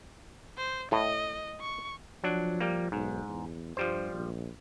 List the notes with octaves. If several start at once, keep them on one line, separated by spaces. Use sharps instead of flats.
C5
A2 D#5
C#6
F3 F#3 D4
G3 A#3
B1 G#2
E2
G2 F3 G3 C5
A#1